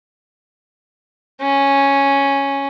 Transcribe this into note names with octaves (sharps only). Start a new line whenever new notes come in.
C#4